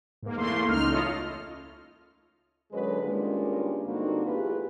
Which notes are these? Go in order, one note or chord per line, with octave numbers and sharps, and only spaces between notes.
G#2 A#3
E2 A3 A#3 C6
C#2 D#4 F6
E4 F4 A4 C#5 D#5
F#2 D3 F#3 G#3 B4 D#5
G2 D#3 G#3 A#3 C#4 F4
G2 D3 A#3 C4 D#4 F#4
E2 A3 F4 G4 G#4 B4